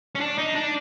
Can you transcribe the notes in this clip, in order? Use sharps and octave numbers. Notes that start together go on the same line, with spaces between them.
C#4
D4
D#4
D4